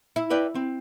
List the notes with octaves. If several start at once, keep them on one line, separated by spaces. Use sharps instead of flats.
E4
B4 D5 G5
C4